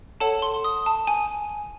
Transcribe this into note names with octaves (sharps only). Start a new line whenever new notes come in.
A4 C#5 F#5 A5
C6
D#6
A5
G#5